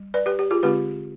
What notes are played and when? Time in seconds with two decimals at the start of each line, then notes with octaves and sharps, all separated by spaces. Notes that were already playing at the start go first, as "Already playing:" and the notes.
Already playing: G3
0.14 B4 D5
0.26 G4 B4
0.39 G4
0.51 F4 G#4
0.63 D3 G#3 C4 F4 G4 B4